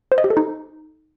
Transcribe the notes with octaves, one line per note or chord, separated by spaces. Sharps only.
C5
D#5
G4
A4
D#4